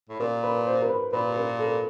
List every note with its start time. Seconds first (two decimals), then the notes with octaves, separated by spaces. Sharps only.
0.09 A2
0.20 A#2 A#4
0.43 B4
0.66 C5
0.82 A#4
0.90 B4
1.13 A#2 B4
1.36 A#4
1.59 A4